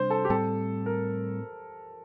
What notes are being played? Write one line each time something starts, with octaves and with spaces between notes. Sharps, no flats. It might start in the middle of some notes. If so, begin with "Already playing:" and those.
Already playing: C3 G3 D4 C5
A4
G4
A2 G3 C4 A4
A#4